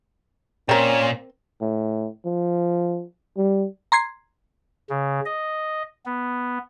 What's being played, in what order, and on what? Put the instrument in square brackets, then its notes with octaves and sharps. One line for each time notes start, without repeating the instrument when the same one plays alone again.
[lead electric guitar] A#2 [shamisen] C4 A#4 [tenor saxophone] C#4
[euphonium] A2
F3
G3
[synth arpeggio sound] A#5 C6 G#6 C7
[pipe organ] C#3
D#5
B3